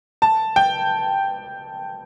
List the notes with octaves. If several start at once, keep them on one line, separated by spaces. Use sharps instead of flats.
A5
G5